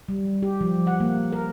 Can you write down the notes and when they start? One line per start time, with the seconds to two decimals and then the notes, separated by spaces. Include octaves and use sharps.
0.09 G3
0.43 G4
0.61 F3
0.87 F#5
1.00 A#3
1.32 A#4